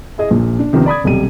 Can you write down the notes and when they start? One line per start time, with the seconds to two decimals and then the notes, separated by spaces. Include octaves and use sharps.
0.18 E4 G#4 D#5
0.30 A#1 A#2
0.59 D4
0.73 C3 D#3 F3 B3 C#4
0.86 D5 B5 D#6 G#6
1.04 D#1 B1 C3 G3 D#7